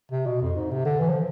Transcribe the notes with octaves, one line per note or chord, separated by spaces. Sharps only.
C3
B2
F2
G#2
C3
D3
E3
F3